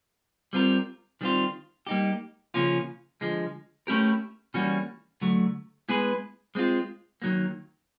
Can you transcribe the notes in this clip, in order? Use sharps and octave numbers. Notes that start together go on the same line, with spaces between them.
G3 C4 F4 A#4
D#3 G3 C4 F4
G3 A#3 D#4 G4
C#3 F3 A#3 C#4 F4
D3 F3 G#3
A3 C#4 E4 G4 A#4
E3 G3 A#3 C#4 F#4
D3 F#3 A3
G#3 B3 E4 G#4 B4
G#3 C4 F4
D#3 F#3 A#3